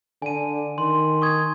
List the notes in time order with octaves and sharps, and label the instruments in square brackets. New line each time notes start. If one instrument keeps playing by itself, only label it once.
[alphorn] D3 [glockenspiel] G#5 D#7
[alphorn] D#3 [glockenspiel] C6
[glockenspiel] C#6 D#6 G#6